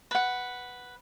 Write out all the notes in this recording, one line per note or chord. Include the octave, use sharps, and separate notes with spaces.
B4 F#5